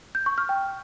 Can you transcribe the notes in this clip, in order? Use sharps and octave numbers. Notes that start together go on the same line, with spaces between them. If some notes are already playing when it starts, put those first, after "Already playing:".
G6
C#6
F6
G5